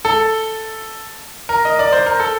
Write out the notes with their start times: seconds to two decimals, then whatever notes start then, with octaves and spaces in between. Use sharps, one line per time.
0.05 A4
1.49 A#4
1.65 D#5
1.79 D5
1.93 C5
2.06 A#4
2.20 A4